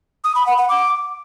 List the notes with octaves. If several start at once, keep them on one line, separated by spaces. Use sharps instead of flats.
D#6
B5
F#5
F#5
D6